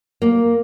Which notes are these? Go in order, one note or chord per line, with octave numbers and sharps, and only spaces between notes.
A#3